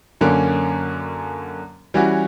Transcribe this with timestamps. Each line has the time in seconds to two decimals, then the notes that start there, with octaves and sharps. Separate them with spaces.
0.21 F#2 D3 A#3 C#4
1.94 E3 G3 C#4 F#4